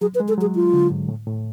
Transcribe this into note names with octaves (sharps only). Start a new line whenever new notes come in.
F#3 G#4
B4
G#3
A4
F#3
G#4
F4
D3
G#2
A2
A2